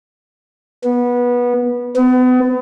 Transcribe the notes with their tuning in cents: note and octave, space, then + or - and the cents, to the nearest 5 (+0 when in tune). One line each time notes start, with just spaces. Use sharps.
B3 -20
B3 +35